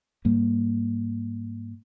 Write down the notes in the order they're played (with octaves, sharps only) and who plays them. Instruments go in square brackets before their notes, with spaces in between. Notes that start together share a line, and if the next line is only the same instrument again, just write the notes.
[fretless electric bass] G#2 G3 A#3